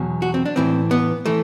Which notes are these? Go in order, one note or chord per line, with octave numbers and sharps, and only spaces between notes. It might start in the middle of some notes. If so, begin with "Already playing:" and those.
Already playing: E2 B2 F#3
F#4
C4
D4
A2 E3 C4
B3
E3 A3